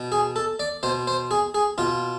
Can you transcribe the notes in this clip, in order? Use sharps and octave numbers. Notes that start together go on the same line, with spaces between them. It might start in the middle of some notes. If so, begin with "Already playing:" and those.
Already playing: B2
G#4
A4
D5
B2 C5
C5
G#4
G#4
B2 F4